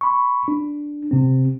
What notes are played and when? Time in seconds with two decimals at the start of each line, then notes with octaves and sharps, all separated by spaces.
0.01 B5 C#6
0.48 D4
1.11 C3 C4